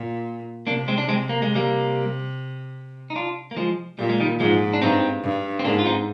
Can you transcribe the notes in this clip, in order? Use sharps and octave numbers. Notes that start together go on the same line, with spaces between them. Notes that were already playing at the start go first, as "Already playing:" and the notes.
Already playing: A#2
C3 A#3 D4
G#3 C4
D4
G#3 C4
A#3
G#3
G3 A#3
D#4
D4 F4
A#3
F3 G#3
A#2 G3
G#3
D#3 G3
G#2 F3 G#3
D4
G2 C4 D#4
G2
C4
G#2 A#3 D4
F4
C4 D#4